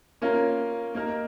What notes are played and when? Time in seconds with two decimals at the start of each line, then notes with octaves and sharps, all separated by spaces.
0.22 A#3 C#4 F4 A#4
0.95 A#3 D#4 A#4